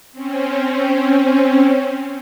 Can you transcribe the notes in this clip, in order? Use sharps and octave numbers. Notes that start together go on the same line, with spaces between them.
C4 C#4